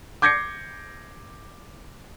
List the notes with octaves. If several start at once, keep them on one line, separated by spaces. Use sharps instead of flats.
D6 G6 G#6 A#6 C7 C#7